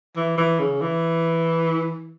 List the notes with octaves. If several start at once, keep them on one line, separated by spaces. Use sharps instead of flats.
E3
E3
C#3
E3